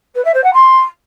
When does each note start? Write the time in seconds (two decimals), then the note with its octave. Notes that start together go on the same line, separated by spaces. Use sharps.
0.15 B4
0.24 E5
0.34 C5
0.43 F#5
0.53 C6